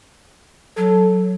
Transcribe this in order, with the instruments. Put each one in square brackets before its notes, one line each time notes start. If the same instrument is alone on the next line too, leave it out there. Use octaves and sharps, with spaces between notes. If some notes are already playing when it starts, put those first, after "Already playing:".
[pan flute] F#3 [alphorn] A4